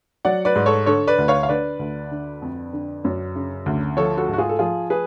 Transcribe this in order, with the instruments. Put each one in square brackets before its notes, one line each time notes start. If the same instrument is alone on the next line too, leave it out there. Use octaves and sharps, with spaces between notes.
[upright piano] F#3 D5 F#5
B4 D5
G#2
A4 C#5
D3 A4 C#5
B4 D5
D2
C#5 F5
F5
D3 B4 D5
D2
D3
F2
D3
F#2
C#3
D2
F3 A4 C#5
F#4 A4
G#2
F#4
F4 G#4
A4
F3 F4 G#4
G#4 B4